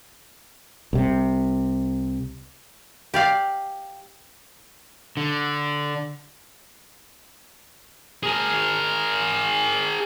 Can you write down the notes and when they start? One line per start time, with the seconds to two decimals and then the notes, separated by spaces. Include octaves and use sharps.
0.93 C2 C3
3.14 G4 D5 F5
5.17 D3
8.23 G#4 A#4